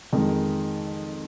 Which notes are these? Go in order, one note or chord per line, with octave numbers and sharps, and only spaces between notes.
F2 D#3 G#3